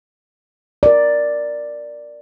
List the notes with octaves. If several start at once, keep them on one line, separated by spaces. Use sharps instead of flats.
A#4 D5